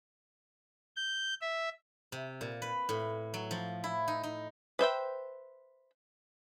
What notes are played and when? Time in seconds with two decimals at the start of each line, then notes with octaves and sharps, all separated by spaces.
0.96 G6
1.41 E5
2.12 C3
2.41 A#2
2.62 B4
2.89 A2
3.34 F#3
3.51 F3
3.84 E4
4.08 D#4
4.23 D#4
4.79 B4 C5 E5 G5